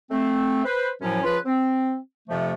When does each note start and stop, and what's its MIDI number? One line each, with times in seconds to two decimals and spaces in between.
0.10 0.61 57
0.10 0.61 60
0.64 0.89 71
0.64 0.89 72
1.01 1.20 42
1.01 1.20 45
1.01 1.20 53
1.01 1.20 54
1.01 1.20 61
1.23 1.38 49
1.23 1.38 53
1.23 1.38 65
1.23 1.38 71
1.45 1.96 60
2.28 2.53 41
2.28 2.53 48
2.28 2.53 53
2.28 2.53 57